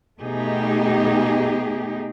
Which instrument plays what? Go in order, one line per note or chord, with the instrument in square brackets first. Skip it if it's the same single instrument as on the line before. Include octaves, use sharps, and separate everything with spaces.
[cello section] B2 A3 D#4 G4 G#4